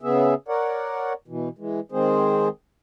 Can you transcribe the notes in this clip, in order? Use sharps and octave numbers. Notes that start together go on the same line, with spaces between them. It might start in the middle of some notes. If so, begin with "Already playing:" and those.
C#3 B3 G#4 E5
A#4 C#5 D5 F#5
B2 E3
E3 G#3
D#3 G#3 C4 G#4 C5